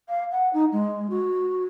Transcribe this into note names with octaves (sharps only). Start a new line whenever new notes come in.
F5
F#5
D#4
G#3
F#4